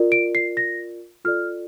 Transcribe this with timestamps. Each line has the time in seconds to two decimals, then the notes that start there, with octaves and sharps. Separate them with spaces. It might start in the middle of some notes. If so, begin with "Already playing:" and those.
Already playing: F4 A#4 D5
0.12 D7
0.35 C7
0.57 A#6
1.25 F4 A4 D5 F6